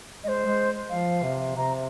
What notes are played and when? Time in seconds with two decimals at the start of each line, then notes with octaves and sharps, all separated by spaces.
0.23 G#3 D#5
0.28 C5
0.45 G#3
0.89 F3 F5
1.23 C3
1.56 C3 A#5